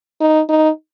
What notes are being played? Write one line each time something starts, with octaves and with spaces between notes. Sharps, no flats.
D#4
D#4